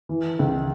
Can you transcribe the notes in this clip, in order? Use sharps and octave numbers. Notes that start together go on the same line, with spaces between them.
E3
C#2